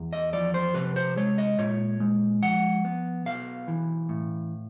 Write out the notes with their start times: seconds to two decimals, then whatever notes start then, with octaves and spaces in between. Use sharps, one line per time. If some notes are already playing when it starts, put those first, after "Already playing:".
Already playing: E2
0.13 D#5
0.33 F3 D5
0.54 C5
0.75 C3 B4
0.96 C5
1.17 G#3 C#5
1.38 D#5
1.59 A#2 C#5
2.00 G#3
2.42 F3 F#5
2.85 B3
3.26 B1 F5
3.68 E3
4.09 A2